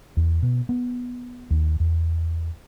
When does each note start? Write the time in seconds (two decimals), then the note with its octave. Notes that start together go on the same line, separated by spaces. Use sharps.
0.17 E2
0.42 B2
0.69 B3
1.50 D#2
1.80 E2